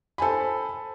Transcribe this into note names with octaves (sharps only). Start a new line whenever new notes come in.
A4 C5 G#5 B5